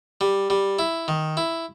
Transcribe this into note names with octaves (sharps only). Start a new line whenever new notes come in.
G3
G3
E4
D#3
E4